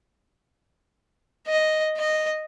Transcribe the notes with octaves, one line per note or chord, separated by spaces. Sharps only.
D#5
D#5